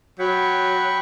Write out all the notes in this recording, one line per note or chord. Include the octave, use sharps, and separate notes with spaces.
F#3 G5 B5 C#6